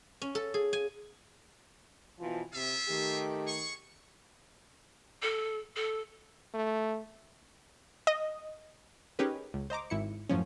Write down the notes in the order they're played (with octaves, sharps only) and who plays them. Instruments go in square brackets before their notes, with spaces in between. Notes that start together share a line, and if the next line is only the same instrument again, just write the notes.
[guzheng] C#4
A4
G#4
G#5
[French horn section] B2 E3 F3
[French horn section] C3 [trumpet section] F4 G#4 E5
[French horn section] D#3 A3 G4
[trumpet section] G#4 C#6
[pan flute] A4
A4
[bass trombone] A3
[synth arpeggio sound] D#5
[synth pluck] C#4 D#4 G4 G#4 A#4 B4
C#2
C5 D#5 A#5 D6
G#1 E4 C#7
F#2 A2 F3 C#4